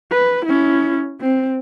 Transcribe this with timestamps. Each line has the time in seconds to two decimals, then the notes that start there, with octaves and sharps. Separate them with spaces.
0.12 B4
0.46 C#4 E4
1.21 C4